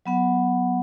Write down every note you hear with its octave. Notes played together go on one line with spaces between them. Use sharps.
F#3 B3 F#5